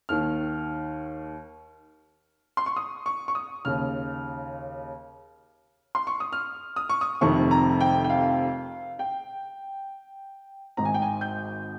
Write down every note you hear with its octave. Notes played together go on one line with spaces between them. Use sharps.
D#2 D#3 F6
C6
C#6
D#6
C#6
C#6
D#6
D#2 C#3 F6
C6
C#6
D#6
F6
D#6
C#6
D#6
F1 F2 C3 D#3 C#6
A#5
G5
G5
F5
G5
G#1 G#2 D#3 A#5
G#5
G5
G#5
G6